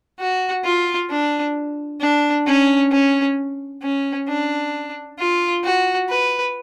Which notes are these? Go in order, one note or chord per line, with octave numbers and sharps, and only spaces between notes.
F#4
F4
D4
D4
C#4
C#4
C#4
D4
F4
F#4
B4